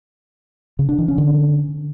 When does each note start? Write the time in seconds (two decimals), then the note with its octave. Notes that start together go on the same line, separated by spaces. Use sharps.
0.79 C#3
0.89 D4
0.98 E3
1.08 C#4
1.18 D3